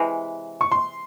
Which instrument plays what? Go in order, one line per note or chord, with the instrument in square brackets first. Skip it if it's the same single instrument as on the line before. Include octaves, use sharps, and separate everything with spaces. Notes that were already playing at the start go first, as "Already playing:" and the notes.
Already playing: [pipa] C3 E3 G#3
[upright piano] C#6
C6